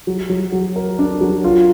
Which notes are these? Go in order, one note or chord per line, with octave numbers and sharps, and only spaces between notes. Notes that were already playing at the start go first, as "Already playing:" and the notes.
F#3
F#3
F#3
A#4
D4
F#3
F4